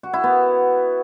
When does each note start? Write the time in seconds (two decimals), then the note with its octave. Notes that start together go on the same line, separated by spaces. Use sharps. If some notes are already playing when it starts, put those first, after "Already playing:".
0.03 F#4
0.13 E4
0.24 B3